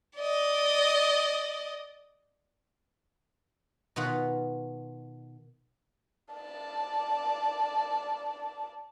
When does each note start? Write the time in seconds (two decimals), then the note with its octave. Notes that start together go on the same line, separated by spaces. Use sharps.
0.17 D5 D#5
3.96 B2 D#3 B3 F4 F#5
6.34 D5 A5